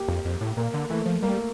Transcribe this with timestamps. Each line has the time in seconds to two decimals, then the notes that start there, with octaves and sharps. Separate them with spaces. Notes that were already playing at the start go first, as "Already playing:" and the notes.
Already playing: A#3 G4
0.08 F2
0.25 F2
0.41 A2
0.57 A#2 A#3
0.74 D3
0.90 E3 A3
1.06 F3
1.22 G3 A#3